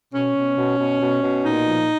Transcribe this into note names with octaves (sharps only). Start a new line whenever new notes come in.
B2 C#4
B2
B2
B2
B2
B2
A#2 D#4
F3